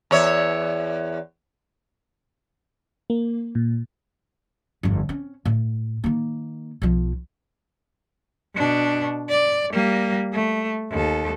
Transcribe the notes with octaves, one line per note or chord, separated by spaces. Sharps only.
E2 C#5 E5
A#3
A#2
G1 F2
C4 C#4
A2
D#3 A#3
B1 F3
B2 D4
D5
G3 A#3
A3
D#2 A4